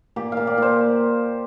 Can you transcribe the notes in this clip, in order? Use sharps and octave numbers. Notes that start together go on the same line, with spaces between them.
A#2 G4
A#2 F5
D5
A#2 C5